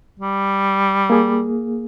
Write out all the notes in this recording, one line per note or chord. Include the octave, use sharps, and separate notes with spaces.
G3
A#3 G#4